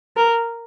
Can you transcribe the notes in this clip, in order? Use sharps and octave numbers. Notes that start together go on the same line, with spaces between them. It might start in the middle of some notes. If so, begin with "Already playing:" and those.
A#4